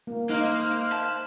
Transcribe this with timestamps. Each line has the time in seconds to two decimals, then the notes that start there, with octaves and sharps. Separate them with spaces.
0.07 A#3
0.30 A#3 D#4 C5 F5 F#6
0.92 A5